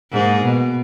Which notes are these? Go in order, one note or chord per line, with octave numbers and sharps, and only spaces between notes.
G#2 A#3 G#4
B2